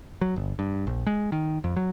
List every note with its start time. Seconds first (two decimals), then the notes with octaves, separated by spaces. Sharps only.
0.21 F#3
0.36 G1
0.59 G2
0.87 A#1
1.07 G#3
1.32 D#3
1.64 F2
1.76 F#3